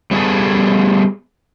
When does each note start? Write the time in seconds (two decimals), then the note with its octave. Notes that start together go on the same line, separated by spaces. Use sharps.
0.11 G3 B3 D#4 G#4 A4